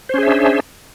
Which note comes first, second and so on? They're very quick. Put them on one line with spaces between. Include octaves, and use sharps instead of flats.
C5 C#4 G#4 E5 D4